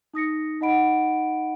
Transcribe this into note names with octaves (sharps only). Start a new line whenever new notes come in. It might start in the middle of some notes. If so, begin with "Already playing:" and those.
D#4 D#6 A#6 C#7
D#4 D#5 F#5 B5 D7